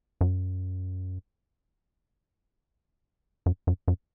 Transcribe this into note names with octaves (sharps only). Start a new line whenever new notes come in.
F#2
F#2
F#2
F#2